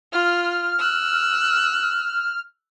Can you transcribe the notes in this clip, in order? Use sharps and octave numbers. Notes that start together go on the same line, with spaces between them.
F4 F6
E6 F#6